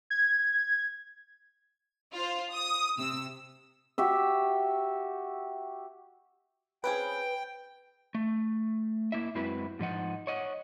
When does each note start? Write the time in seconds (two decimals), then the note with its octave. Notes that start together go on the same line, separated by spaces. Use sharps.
0.10 G#6
2.14 F4 C5
2.52 D#6
2.98 C3 E6
3.98 F#4 G4 E5
6.84 C4 C#4 G#4 B4 G5
8.15 A3
9.12 A#3 E4 E5
9.35 F#2 G#3 C4 E4 F#4 B4
9.79 G#2 F3 D#4 F#5
10.27 C#5 D#5 F#5